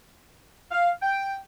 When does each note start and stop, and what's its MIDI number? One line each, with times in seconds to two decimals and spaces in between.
0.71 0.91 77
1.02 1.37 79